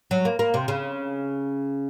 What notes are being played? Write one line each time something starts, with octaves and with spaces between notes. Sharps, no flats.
F#3
A#3
A#3
C3
C#3